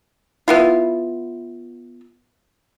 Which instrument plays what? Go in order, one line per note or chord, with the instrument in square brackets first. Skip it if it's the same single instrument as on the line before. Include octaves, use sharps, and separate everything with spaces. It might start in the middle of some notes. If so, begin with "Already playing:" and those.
[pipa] B3 E4 F4